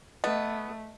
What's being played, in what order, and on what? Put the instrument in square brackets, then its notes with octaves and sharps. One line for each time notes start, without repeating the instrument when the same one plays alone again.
[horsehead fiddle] A3 [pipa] B3 [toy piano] D#5